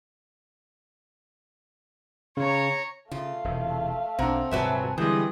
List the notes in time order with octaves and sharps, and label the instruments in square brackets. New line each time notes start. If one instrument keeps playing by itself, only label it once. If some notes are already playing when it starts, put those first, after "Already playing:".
[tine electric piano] C#3 [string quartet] C#5 A#5
[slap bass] C#3 [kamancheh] A3 F5 [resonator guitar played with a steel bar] F4
[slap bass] E1 C3
[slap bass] B1 D4 [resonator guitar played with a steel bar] A#3 [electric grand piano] C4 F#5 A#5
[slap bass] D#1 G#2 C3 [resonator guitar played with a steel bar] F#3 B4 E5 [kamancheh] G#5 A5
[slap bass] D3 [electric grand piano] E3 G3 G#3 [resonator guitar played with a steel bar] C4 [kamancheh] D#6